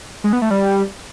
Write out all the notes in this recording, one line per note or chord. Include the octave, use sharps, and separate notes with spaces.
G#3
B3
A3
G3